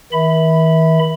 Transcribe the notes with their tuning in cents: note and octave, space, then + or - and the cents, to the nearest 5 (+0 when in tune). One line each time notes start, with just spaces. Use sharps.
D#3 +45 E5 -20 B5 +10